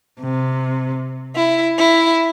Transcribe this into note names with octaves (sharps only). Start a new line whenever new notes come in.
C3
E4
E4